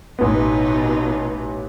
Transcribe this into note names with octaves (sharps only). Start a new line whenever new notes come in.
A1 B2 B3 D#4